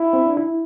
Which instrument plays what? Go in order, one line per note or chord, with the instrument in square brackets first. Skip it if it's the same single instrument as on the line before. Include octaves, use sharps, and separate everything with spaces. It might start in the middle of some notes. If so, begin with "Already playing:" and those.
Already playing: [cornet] E4
[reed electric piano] C4
D4
E4